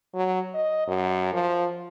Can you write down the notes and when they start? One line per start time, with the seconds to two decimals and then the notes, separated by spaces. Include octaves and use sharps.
0.15 F#3
0.54 D#5
0.88 F#2
1.33 F3